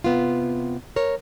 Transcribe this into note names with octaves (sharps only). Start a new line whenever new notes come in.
C3 B3 F4
A#4 C#5